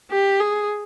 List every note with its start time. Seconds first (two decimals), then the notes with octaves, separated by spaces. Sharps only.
0.11 G4
0.40 G#4